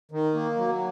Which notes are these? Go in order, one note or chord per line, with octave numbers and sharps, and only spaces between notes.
D#3
A#3
F#3